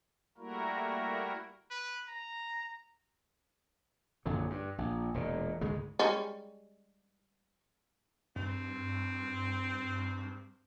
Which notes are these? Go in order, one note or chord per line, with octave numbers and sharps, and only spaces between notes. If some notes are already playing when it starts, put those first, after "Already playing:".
G3 A3 A#3 E4 F#4 A#4
B4
A#5
A#1 F#2 D3 F#3
G2
A#1
E1 A#2
D2 G#2 C#3 G#3
G3 G#3 C#4
G2 C4